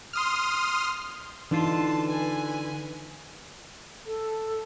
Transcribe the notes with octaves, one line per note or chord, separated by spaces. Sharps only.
C6 D#6 F6
D3 E3 D#4 F4 A5
B4 G#5
A4